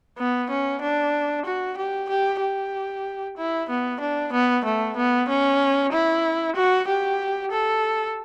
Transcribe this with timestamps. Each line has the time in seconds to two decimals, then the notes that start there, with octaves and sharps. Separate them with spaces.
0.18 B3
0.50 C#4
0.82 D4
1.45 F#4
1.77 G4
2.09 G4
2.41 G4
3.37 E4
3.69 B3
4.00 D4
4.33 B3
4.65 A3
4.97 B3
5.29 C#4
5.92 E4
6.56 F#4
6.87 G4
7.52 A4